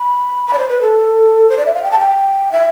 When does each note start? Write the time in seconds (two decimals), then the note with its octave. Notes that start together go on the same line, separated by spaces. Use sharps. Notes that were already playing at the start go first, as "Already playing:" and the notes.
Already playing: B5
0.47 B5
0.53 D5
0.58 C5
0.69 B4
0.81 A4
1.49 C5
1.58 D5
1.66 E5
1.75 F5
1.83 G5
1.91 A5
1.99 G5
2.52 E5